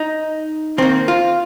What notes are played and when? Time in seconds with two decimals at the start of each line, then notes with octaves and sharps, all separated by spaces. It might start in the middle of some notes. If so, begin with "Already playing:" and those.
Already playing: D#4
0.78 D#3 A#3 C4
1.08 F4